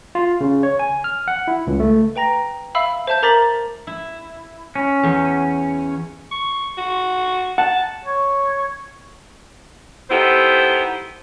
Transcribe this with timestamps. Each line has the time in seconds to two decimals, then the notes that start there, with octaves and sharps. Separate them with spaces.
0.15 F4
0.41 C#3
0.63 C#5
0.79 G#5
1.04 F6
1.28 F#5
1.48 E4
1.67 C#2
1.80 A3
2.16 B4 G5 A#5 A#6
2.75 E5 F5 B5 E6
3.07 C5 E5 A5 G6
3.23 A#4 A#5 D6 A6 B6 F#7
3.87 E4
4.75 C#4
5.03 E2
6.32 C#6
6.77 F#4
7.58 F#5 A5
8.05 C#5
10.10 B3 D#4 E4 G4 A4 C5